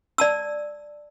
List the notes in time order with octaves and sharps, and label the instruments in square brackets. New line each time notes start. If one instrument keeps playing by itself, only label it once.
[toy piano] D5 A5 E6